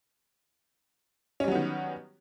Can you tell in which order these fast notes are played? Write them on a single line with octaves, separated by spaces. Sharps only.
C#4 G3 F#3 B3 D#3